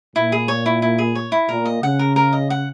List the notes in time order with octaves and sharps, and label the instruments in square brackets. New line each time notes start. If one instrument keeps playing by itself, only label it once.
[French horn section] A#2 [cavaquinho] E4
[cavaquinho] G#4
C#5
E4
E4
G#4
C#5
E4
[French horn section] A#2 [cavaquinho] A#4
[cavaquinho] D#5
[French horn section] C#3 [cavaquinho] F#5
[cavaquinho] A#4
A#4
D#5
F#5